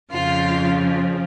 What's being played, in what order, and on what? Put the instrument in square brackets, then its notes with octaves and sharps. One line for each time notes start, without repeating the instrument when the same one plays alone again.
[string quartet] F2 C#3 F3 F4 F5